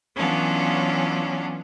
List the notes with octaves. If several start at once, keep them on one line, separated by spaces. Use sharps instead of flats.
E3 F#3 B3 C#4 D4 F4